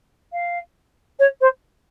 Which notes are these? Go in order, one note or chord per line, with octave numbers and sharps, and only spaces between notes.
F5
C#5
C5